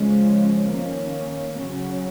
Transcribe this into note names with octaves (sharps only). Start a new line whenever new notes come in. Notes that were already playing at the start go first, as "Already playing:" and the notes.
Already playing: C#3 F3 G#3 C#4
D#3 A#3 C#4
C#3 F#3 C#4